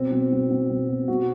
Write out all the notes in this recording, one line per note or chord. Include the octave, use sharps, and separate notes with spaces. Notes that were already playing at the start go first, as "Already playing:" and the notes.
Already playing: B2 C4
B2
B2
B2
B2
B2
B2 F#4